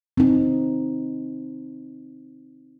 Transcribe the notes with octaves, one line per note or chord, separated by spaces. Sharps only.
C4 D#4